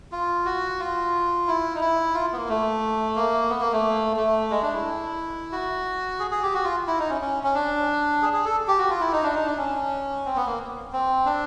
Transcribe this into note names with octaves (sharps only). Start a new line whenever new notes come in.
F4
F#4
F4
E4
D#4
E4
F4
B3
A#3
A3
A#3
B3
A#3
A3
A3
G#3
D4
E4
F#4
G#4
G#4
G4
F#4
F4
E4
D#4
C#4
C#4
C#4
D4
G#4
G#4
A4
G4
F#4
F4
E4
D#4
D4
D#4
D4
C#4
C4
B3
A#3
C4
D4